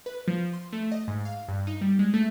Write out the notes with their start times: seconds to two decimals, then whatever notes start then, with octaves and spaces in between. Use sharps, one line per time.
0.06 B4
0.28 F3
0.53 C6
0.73 A3
0.92 D#5
1.08 G#2
1.25 F5
1.48 G2
1.67 D#4
1.81 G3
1.99 G#3
2.14 A3